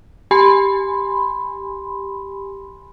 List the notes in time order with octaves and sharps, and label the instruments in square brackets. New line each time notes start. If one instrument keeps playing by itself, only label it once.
[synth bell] G4 G#5 B5 C6